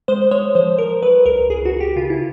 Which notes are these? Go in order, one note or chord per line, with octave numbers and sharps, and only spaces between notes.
G#3 C5
C5
G#3 C#5
F3 C5
F3 A#4
F#3 B4
C#2 A#4
C#2 G#4
F#4
C#2
G4
C#3 F4
E4